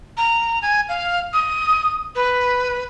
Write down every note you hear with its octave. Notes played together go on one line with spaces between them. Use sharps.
A#5
G#5
F5
D#6
B4